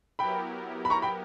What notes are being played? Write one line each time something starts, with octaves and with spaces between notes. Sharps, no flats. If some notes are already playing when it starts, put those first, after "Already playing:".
F#3 B3 E4 G4 A#4 G5 B5
B5
A#5 C#6
G5 B5